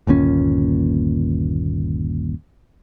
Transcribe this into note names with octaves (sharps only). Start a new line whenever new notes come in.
G1 D#2 A#2 C#4